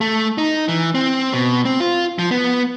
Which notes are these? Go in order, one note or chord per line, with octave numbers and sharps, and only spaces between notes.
A3
D#4
E3
C4
B2
C4
F4
F3
B3